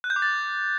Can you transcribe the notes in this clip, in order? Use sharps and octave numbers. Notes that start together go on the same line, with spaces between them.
F#6
G6
D6
A6